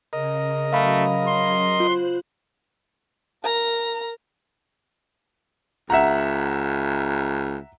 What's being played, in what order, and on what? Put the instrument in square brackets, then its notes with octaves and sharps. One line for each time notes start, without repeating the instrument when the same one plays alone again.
[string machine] C#3 [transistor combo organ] A#4 D#5
[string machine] C#3 F#3 [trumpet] A3 [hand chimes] F5 B5
[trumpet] C6
[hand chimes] F4 [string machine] C5 F#6
[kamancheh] A#4 A#5
[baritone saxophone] C#2 [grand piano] E5 F#5 A#5